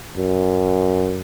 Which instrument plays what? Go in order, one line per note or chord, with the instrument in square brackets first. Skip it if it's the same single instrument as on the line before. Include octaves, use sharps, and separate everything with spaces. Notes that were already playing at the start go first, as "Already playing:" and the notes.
[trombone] F#2